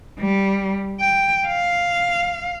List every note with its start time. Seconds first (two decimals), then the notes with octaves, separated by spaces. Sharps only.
0.20 G3
1.00 G5
1.48 F5